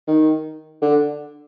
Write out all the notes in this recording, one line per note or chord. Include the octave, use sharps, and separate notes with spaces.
D#3
D3